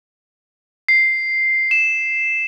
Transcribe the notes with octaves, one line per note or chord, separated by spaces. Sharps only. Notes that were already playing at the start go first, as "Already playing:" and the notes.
C7
E7